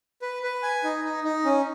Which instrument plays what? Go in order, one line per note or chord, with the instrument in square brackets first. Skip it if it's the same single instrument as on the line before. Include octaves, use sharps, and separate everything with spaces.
[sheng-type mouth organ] B4
B4
G#5
D#4
D#4
D#4
C#4